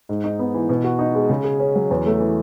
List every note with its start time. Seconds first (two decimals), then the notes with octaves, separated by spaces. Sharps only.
0.09 G#2
0.24 D#4
0.39 B3
0.54 E3
0.69 B2
0.84 F#4
0.99 D#4
1.15 G#3
1.30 C#3
1.44 G#4
1.60 C#4
1.75 F#3
1.91 E2
2.06 A3
2.20 E3